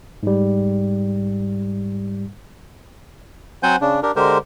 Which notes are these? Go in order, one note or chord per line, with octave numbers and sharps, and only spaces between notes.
G#2 G3
F#3 C4 C5 F#5 G#5 G6
C#3 D4
D4 G4 A#4
D3 G#3 G4 A#4 C5